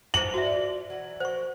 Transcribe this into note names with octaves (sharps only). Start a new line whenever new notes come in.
E4 G#4 C5 F#7
F4 F#4 A4 D5 E5
E3 F#3 F#5
F3 A#3 F#4 C5 C#6